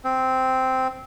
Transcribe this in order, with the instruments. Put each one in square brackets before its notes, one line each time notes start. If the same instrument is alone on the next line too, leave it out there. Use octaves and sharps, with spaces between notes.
[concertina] C4